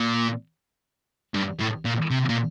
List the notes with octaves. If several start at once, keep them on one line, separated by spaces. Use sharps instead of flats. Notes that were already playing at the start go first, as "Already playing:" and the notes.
Already playing: A#2
G2
A2
A#2
C3
A#2